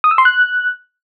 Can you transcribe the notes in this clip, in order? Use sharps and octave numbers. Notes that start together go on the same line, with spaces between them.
D#6
E6
C6
F#6